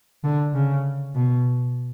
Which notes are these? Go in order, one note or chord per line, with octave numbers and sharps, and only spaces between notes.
D3
C#3
B2